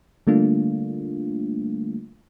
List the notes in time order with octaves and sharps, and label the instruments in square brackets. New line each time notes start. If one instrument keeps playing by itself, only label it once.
[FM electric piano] D3 G3 A3 A#3 D4 F4